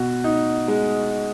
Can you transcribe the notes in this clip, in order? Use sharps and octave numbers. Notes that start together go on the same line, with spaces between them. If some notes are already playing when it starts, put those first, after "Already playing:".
Already playing: B2 F#4
D#4
G#3